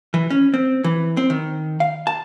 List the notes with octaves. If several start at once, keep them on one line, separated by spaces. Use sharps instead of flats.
E3
C#4
C4
E3
C4
D#3
F5
A5